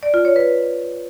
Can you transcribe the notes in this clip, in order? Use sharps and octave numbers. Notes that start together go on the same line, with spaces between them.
D5
F4
C#5
B4